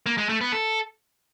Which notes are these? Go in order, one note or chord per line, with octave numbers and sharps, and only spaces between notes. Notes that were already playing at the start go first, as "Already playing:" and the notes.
A#3
G#3
A3
B3
A4